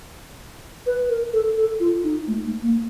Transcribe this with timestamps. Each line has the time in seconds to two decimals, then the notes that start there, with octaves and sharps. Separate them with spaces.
0.86 B4
1.09 A#4
1.33 A4
1.57 A4
1.80 F4
2.04 D#4
2.27 A3
2.46 A3
2.63 A#3